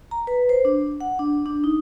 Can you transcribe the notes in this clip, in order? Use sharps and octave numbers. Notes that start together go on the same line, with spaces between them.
A#5
B4
C5
D4
F#5
D4
D4
D#4